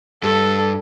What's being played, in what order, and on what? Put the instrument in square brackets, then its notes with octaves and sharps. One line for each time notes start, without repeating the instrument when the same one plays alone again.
[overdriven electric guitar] G2 [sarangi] A4